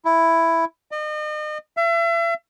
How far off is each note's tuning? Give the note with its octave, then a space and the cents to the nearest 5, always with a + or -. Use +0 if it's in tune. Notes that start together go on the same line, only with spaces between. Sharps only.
E4 +5
D#5 -40
E5 +40